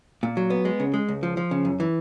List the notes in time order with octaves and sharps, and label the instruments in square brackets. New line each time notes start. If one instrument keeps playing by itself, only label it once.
[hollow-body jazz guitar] A#2
F#3
B3
G#3
C#3
G#3
C#2
F3
F3
C#3
F#2
E3